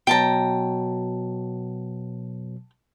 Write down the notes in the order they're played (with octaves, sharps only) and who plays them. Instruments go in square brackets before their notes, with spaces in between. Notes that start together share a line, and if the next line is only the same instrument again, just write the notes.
[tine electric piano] B2 F#3 [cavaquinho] G5 A5 A#5